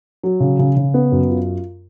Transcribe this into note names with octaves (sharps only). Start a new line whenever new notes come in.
F#3
C#3
C#3
C#3
B3
F#2
F4